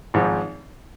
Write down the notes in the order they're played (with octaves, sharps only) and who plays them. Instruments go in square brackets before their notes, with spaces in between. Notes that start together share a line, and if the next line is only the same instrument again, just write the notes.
[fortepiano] G#1 G#2 F3